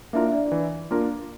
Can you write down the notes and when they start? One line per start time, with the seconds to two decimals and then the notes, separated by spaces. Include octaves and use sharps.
0.13 A#3 D4 E4 F4 A#4 E5
0.28 E5
0.33 D4 D5
0.52 E3
0.91 A#3 D4 F4 A#4